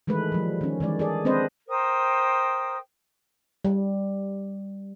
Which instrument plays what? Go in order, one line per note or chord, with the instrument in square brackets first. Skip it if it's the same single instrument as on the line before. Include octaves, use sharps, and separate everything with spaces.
[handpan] D#3 E3 G#3 A3 B4
F3 G3
D#3 C#4
D#3 E3 G#3 D5
G#4 A4 D5
G#3 C4 D4 B4 C5 D#5
[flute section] A#4 C5 G5 D#6
[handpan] G3